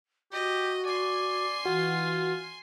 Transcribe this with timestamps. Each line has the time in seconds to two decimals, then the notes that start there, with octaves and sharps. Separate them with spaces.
0.32 F#4 G4 D#5
0.85 D5 G#5 C6
1.65 E3 F4 F#4